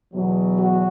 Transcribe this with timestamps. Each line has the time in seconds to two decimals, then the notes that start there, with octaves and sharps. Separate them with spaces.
0.13 E2 B2 F#3
0.59 F#4